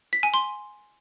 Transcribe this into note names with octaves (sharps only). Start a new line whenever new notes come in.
B6
G#5
C6